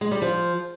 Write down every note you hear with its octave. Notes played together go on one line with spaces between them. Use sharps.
G#3
G3
F3